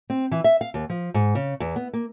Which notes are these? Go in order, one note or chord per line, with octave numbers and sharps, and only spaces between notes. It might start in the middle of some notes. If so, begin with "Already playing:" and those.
C4
E3
E5
F5
D#2
F3
G#2
C#3
E2
B3
A#3